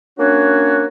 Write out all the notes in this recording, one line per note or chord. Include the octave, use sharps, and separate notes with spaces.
A#3 C#4 D4 F#4 C#5